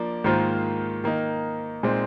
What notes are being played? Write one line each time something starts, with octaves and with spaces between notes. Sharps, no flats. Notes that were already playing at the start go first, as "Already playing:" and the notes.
Already playing: F3 A#3 D4 D5
G#2 D#3 A#3 F4 C5
D#3 A#3 D#4
A#2 G#3 C4 D#4